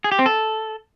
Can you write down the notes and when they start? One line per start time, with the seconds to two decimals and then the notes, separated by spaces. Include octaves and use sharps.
0.04 G#4
0.12 G4
0.19 C4
0.26 A4